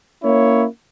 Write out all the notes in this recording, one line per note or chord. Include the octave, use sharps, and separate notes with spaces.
A#3 C#4 E4 C#5